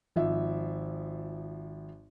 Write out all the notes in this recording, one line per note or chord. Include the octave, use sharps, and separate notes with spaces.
G#1 F3 E5